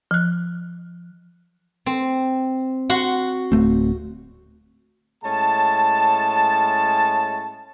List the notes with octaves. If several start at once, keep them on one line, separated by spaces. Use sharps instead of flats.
F3 F#6
C4
F#4 F#5 C6
D1 A3 C4
A2 G#3 C#4 A5